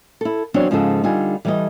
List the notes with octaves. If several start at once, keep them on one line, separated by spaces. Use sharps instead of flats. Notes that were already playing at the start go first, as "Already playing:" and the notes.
E4 A4
E2 F#3 C4 D4 C#5
G#2 C#3 F3 F4 G#4 A4
D3 G3 D#4 F4 G#5
E3 G3 G4 A4 D#5